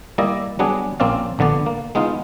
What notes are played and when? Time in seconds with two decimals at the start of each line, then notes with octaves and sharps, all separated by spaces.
0.18 G3 A#3 E4 D5 D#5
0.59 F#3 G3 B3 D4 G#4
1.00 A#1 A#3 C4 C#4 D5 F5
1.39 A#1 D3 B3 D5
1.66 A#3
1.95 G#3 B3 D#4 F4